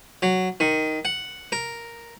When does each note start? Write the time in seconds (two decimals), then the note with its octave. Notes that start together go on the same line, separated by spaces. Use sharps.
0.22 F#3
0.60 D#3
1.05 F#5
1.52 A#4